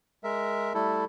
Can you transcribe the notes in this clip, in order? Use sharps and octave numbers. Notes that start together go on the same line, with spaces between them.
G#3 A#4 E5
G3 A3 E4 A4